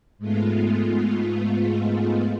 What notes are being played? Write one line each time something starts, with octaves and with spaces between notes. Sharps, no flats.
G#2 G#3 A3 B3 F4